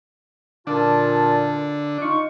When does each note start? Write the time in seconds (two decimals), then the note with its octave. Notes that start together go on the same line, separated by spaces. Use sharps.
0.67 A#2 D3 D4 F4 A5
2.01 D#4 F4 C#6